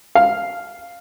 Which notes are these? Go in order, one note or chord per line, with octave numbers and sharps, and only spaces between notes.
F5